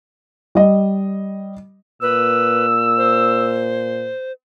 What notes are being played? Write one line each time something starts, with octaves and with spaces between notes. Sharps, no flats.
G3 D#5
A#2 B4 E6
C5